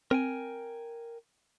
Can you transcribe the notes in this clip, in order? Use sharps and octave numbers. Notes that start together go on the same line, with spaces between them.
C4 A#4 G5 G#5